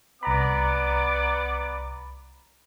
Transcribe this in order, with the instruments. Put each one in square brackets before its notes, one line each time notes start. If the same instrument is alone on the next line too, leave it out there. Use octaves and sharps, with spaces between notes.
[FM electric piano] C2 A#5 B5 [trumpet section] B3 D5 D6